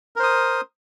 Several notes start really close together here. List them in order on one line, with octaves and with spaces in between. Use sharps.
A#4 C5 D#6